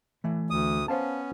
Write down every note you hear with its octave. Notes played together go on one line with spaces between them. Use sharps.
E3 A3
D2 D#6
B3 C#4 C5 F5 A5